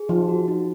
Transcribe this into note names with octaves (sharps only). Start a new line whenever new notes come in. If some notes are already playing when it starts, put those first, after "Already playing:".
Already playing: G#4
F3 D#4
F#4
D#4